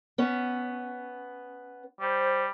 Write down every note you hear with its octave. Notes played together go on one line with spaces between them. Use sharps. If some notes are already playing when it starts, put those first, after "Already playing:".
B3 C#4
G3 C5